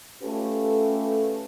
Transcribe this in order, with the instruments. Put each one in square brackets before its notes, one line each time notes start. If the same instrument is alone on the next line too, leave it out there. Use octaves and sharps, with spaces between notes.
[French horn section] A3 C#4 F4 G4 A4 B4